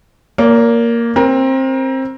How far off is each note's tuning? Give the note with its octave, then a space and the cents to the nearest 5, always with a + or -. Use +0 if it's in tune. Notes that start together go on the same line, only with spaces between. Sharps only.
A#3 +0 D5 -45
C4 +20 A#4 +25